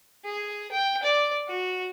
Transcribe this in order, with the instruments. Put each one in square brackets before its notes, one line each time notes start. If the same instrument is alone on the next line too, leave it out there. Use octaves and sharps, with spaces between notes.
[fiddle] G#4
G5
D5
F#4